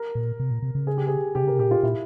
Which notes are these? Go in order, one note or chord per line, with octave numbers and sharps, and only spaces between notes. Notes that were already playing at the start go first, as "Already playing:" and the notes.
Already playing: A#4
A#2
C3
A#2
C3
C#3
G#4
G4
G#4
C3 G4
C#3
A#4
C3
A#2 G4
F4
A#2 E4